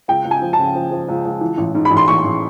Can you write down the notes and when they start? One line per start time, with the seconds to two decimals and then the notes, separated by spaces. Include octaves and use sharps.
0.08 C#2 G5
0.25 C#2
0.31 G#5
0.42 F3
0.53 A5
0.58 C#3
0.75 F3
0.91 F3
1.08 C#2
1.25 C#2
1.41 E3
1.58 A1
1.75 G#2
1.85 B5
1.91 A1
1.97 C6
2.08 A1 C#6
2.25 A1